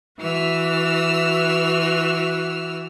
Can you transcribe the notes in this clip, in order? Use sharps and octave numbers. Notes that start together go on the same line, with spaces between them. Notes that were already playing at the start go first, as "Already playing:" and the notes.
E3 F#4 E6 F6